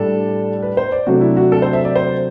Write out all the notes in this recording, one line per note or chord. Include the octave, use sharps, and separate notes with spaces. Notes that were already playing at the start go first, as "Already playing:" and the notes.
Already playing: A2 G3 D4 A4
B4
C5
D5
C3 F#3 A3 D4 F#4
E4
F#4
A4
C5
E5
D5
C5